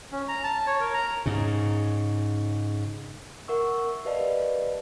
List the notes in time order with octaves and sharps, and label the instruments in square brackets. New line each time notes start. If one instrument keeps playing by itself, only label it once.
[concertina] C#4
A#5
A5
C#5
A#4
A#5
[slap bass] G#2 C#3
[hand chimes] A#4 E5 F#5 C#6 E6
G4 B4 D5 D#5 F5 A5